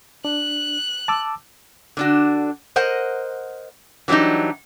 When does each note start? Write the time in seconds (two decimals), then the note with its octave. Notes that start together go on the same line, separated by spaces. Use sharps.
0.25 D4 F#6
1.08 A5 D6 E6
1.97 D3 D4 F#4
2.76 A#4 C5 D#5 F#5
4.08 E3 F#3 G3 D4 D#4